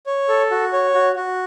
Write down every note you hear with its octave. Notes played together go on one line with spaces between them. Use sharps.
C#5
A4
F#4
C#5
F#4
F#4